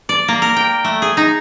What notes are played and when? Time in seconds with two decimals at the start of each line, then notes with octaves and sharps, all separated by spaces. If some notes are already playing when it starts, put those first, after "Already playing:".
0.09 D5
0.28 A#3
0.42 A#4
0.56 G5
0.84 A3
1.02 G#4
1.17 D#4